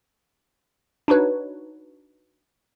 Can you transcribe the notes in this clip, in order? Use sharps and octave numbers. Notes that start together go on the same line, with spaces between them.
D4 D#4 F#4 B4 C#5